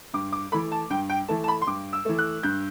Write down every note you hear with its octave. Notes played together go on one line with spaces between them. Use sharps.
G2 D6
D6
E3 A3 B5
A5
G2 G5
G5
E3 A3 A5
A5
B5
C6
G2 D6
E6
E3 A3
F#6
G2 G6